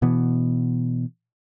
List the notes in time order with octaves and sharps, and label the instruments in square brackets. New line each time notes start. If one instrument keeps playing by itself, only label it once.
[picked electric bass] B2 E3 B3